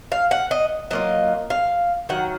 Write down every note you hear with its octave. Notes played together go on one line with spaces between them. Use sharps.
F5
F#5
D#5
F#3 A#3 F4 D#5
F5
D#3 F#3 F#5